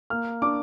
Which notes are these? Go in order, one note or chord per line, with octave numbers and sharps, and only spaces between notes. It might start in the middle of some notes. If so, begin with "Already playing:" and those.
A#3 F6
D4 D6